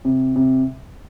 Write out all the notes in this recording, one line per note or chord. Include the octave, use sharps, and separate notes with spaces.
C3
C3